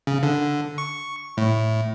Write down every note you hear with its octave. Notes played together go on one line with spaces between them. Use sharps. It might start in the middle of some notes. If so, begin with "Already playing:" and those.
C#3
D3
C#6
A2